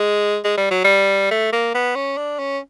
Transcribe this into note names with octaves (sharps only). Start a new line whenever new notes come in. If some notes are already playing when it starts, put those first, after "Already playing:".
Already playing: G#3
G#3
G3
F#3
G3
A3
A#3
B3
C#4
D4
C#4